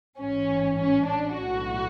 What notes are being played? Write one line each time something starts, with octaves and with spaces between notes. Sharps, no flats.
A1 G#2 E3 C#4
C#4
D4
B1 A2 E3 F#4